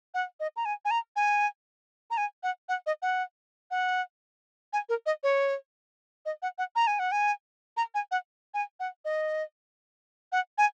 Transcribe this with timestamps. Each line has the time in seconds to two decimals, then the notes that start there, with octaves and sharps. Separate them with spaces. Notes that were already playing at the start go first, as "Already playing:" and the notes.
0.14 F#5
0.40 D#5
0.56 A#5
0.65 G#5
0.85 G#5
0.91 A#5
1.16 G#5
2.11 A#5
2.17 G#5
2.43 F#5
2.69 F#5
2.86 D#5
3.02 F#5
3.71 F#5
4.73 G#5
4.89 A#4
5.06 D#5
5.23 C#5
6.26 D#5
6.42 F#5
6.58 F#5
6.76 A#5
6.87 G#5
6.99 F#5
7.12 G#5
7.77 A#5
7.95 G#5
8.11 F#5
8.54 G#5
8.80 F#5
9.05 D#5
10.32 F#5
10.58 G#5